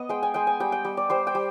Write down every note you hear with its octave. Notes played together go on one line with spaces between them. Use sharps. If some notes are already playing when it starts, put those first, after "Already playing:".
Already playing: B3 D#5
G#3 G5
G#5
G#3 G5
G#5
G3 G5
G5
G3
D5
G3 C5
G5
G3